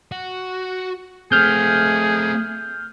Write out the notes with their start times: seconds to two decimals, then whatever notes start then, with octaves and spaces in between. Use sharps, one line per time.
0.12 F#4
1.32 A3 C4 G#4 F6 G6